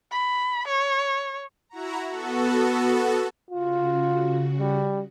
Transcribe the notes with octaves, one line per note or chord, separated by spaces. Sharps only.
B5
C#5
E4 F#4 A#5
B3 F#4 A4
C#3 F4 F#4
G3